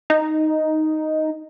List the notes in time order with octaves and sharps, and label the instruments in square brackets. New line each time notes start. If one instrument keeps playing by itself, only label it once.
[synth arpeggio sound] D#4